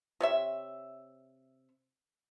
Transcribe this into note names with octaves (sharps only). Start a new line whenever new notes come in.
C3 C#5 E5